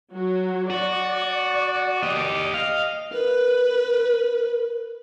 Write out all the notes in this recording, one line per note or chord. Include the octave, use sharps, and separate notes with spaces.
F#3 F#4
F#4 D5
G4 D#5
D#5 F5
A#4 B4